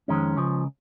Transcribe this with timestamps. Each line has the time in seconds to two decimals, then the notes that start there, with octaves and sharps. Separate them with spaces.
0.08 F2 D#3 G#3 C#4
0.37 C#2 C#3 F3